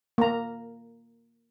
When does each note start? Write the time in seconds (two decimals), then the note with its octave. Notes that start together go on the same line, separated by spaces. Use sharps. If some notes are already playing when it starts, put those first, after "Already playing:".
0.18 A#3 A#5